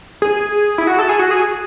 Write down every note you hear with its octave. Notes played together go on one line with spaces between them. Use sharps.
G#4
E4
F#4
A4
G#4
F#4
G#4